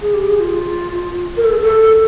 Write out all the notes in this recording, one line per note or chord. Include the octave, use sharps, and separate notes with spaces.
G#4
G4
G#4
F4
A#4
A4
G#4
A4